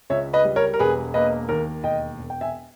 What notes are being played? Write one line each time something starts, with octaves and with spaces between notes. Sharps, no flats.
C#2 C#5 E5
B4 D#5
G3
A#4 C#5
A#4
E1 G#4 B4
A#3 B4 D#5
D#2 A#4
E1 D#5 G5
E1
G5
E5 G#5